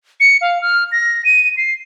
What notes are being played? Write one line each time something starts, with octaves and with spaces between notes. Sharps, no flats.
C#7
F5
F6
A#6
D#7
C7